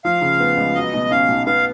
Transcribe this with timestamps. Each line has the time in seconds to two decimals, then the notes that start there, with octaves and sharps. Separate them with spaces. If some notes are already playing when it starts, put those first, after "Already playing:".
0.05 F3 F5
0.21 C#3
0.40 B3
0.57 C#2
0.75 F#3 D#5
0.94 B2
1.11 C#4 F5
1.28 B1
1.47 B3 F5